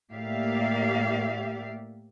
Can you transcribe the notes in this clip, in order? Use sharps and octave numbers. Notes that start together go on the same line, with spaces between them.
A2 A#3 G4 D5 E5 F5